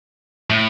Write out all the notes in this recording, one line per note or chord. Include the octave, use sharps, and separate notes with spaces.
A2